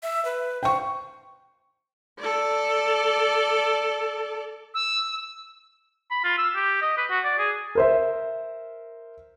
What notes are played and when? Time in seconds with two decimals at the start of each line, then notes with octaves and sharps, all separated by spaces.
0.03 E5
0.25 B4
0.63 C5 G5 C#6
2.19 A4 D5
4.74 E6
6.11 B5
6.24 F4
6.38 E6
6.55 G4
6.82 D#5
6.98 B4
7.10 F#4
7.24 D5
7.38 G#4
7.75 A#4 C5 E5